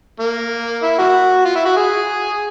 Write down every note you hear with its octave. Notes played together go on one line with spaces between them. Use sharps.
A#3
E4
A#3 F#4
F4
E4
F#4
G#4